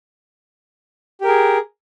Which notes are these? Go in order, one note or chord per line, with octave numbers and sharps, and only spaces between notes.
G4 G#4 A#4